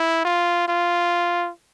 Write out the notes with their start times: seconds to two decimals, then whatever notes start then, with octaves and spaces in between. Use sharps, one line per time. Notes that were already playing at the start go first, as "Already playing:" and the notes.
Already playing: E4
0.25 F4
0.68 F4